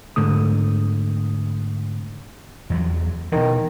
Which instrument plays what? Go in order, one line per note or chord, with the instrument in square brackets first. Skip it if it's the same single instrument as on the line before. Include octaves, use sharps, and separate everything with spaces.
[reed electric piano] G#2 D3 A3 D#6
[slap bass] E2 F#3
[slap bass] B2 E3 [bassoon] D#3